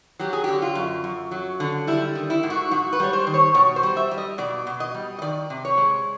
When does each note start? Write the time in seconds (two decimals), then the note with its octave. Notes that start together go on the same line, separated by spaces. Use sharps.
0.19 F#3 G4
0.33 G#4
0.44 D3 G4
0.62 F4
0.75 F#2
1.04 F#2
1.31 F#3
1.60 D3
1.87 G3 E4
2.15 D#3
2.30 E4
2.43 G#2
2.50 F#4
2.71 G#2 F#4
2.93 B4
3.00 G3 C#5
3.13 C5
3.27 D#3
3.34 C#5
3.54 B2 C#5
3.76 C5
3.83 G3
3.97 E5
4.11 G3
4.18 D#5
4.38 B2 D5
4.67 B2
4.80 D#5
4.94 G3
5.18 D#5
5.22 D#3 D5
5.50 C3
5.65 C#5
5.78 G#3